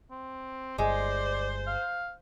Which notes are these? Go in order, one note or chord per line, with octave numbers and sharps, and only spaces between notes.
C4
G1 G#3 C5 D5
F5